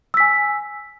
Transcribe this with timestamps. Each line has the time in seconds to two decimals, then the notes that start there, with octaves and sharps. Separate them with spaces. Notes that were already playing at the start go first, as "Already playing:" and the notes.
0.14 E6
0.17 B6
0.20 G#5